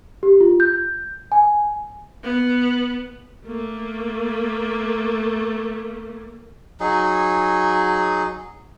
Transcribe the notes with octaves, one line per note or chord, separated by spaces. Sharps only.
G4
F4
G6
G#5
B3
A3 A#3
F#3 D#4 G#4